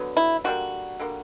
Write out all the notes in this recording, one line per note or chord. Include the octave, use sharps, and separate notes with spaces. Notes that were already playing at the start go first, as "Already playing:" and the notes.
Already playing: D3 F#3 B3
E4
D3 G3 A#3 F#4
D3 G3 A#3